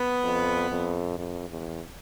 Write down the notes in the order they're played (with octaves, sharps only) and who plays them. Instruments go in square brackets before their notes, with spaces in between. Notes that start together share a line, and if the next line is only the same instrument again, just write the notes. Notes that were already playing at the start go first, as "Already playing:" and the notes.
Already playing: [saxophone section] B3
[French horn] F2
F2
F2
E2